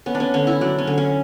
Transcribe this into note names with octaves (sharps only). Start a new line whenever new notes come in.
B3 C#4
D4
C#4
D3 C#4
E4
F#3 D4
C#4
D3
C#4